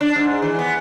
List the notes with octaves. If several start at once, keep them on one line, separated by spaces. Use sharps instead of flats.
D4
G#2
E3
B3